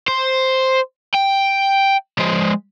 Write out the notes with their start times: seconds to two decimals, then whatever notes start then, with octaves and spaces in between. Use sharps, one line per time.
0.08 C5
1.14 G5
2.19 F3 G#3